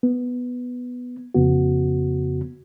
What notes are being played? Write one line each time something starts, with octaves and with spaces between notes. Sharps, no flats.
B3
F2 C#3 B3 F#4